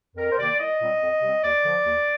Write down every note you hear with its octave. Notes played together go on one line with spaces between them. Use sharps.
F2 A#4
C5
C3 D#3 A#3 D5
C2 D#5
A#2 G3 C4
F2
C3 G3 C4
D#2 D5
D3 F3
D#2